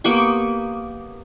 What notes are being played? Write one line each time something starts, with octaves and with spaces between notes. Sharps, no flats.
A#3 B3 G4 C#6